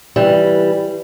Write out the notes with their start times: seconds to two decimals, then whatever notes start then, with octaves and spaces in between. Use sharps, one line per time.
0.16 E3 G3